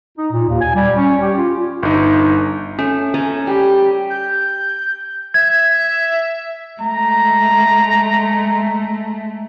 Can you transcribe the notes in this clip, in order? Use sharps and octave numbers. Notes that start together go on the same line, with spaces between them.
D#4
A#2
D#2
G#5
G3
C#4
G4
F4
G1 D#4
A3 C#4
C#4 A4 G#5 A#5
G3 G4
G6
E5 G#6
G#3 A3 A#5